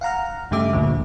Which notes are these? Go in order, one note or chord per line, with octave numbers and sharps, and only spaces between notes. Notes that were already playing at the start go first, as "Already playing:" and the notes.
F5 F#5 A#5 F6
G2 C#3 A3 G4 E5 D6
G1 D2 A#2 D3 F3